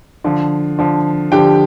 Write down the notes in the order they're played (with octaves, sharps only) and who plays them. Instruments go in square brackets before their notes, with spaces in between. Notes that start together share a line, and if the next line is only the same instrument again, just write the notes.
[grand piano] D3 F3
D3 F3
D3 F3 G4 G5